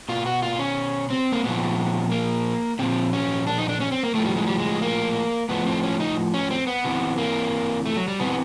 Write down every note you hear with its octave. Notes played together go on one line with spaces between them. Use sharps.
B2 F4
F#4
F4
C#4
C4
A#3
A#2 F3 B3
A#3
A#2 F3 C4
C#4
D4
D#4
D4
C#4
C4
A#3
A2 F3 A3
G3
G#3
G3
G#3
A#3
A2 F3 B3
C4
C#4
D#4
C#4
C4
B3
C3 E3
A#3
A3
F#3
G3
C3 E3 B3